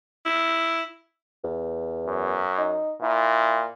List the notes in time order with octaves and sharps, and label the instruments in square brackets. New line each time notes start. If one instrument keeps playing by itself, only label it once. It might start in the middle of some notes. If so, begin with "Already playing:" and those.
[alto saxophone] E4
[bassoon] E2
[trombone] F#2
[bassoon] D#4
[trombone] A#2 [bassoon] E4